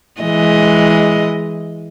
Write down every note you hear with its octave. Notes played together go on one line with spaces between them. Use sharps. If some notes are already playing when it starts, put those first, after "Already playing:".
E3 G#3 D#5